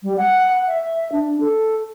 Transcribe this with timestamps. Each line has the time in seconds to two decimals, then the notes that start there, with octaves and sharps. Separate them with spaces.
0.03 G3
0.17 F#5
0.68 E5
1.12 D4
1.40 A4